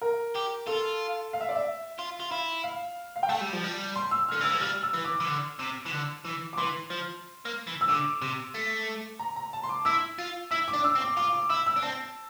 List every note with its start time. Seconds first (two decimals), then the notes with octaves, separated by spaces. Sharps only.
0.02 A#4
0.35 G4
0.67 F4 A4
1.33 F5
1.40 E5
1.49 D5
1.56 E5
1.99 F4
2.20 F4
2.32 E4
2.64 F5
3.16 F5
3.23 G5
3.29 A3 A5
3.41 G3
3.53 F3
3.64 G3
3.96 C6
4.11 E6
4.29 D3 F6
4.41 E3 E6
4.51 F3
4.61 G3 F6
4.83 E6
4.93 E3
5.04 D6
5.20 E3
5.26 D3
5.59 C3
5.86 E3
5.92 D3
6.25 E3
6.53 D6
6.57 E3 C6
6.90 F3
7.45 A#3
7.67 E3
7.81 E6
7.88 D3 D6
8.22 C3
8.54 A3
9.19 A#5
9.36 A#5
9.53 A5
9.63 C6
9.69 D6
9.85 E4 E6
10.18 F4
10.51 E4 E6
10.68 D6
10.73 D4
10.84 E6
10.95 C4
11.01 D6
11.17 F4 D6
11.33 D6
11.49 E4 E6
11.66 E6
11.76 D4
11.82 C4 A5